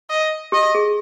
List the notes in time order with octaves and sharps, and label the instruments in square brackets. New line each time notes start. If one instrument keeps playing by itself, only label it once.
[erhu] D#5
[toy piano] G4 [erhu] D#5
[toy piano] G#4